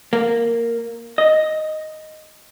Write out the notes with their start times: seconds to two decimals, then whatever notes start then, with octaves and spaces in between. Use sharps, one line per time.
0.13 A#3
1.18 D#5